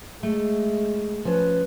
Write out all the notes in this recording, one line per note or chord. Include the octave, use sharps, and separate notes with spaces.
G#3 A3
F3 C#4 B4